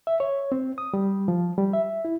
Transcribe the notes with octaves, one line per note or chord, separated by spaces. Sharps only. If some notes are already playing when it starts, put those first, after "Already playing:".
E5
C#5
C4
D#6
G3
F3
G3
E5
E4